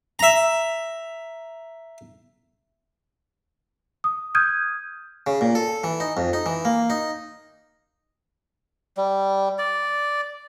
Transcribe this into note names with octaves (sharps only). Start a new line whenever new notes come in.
E5 A#5
D#6
D#6 F6 G6 G#6 D#7
C#3
A#2
A4
E3
D#4
F2
D#4
E3
A#3
D#4
G3
D5